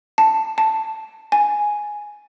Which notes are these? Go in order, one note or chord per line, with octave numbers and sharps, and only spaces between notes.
A5
A5
G#5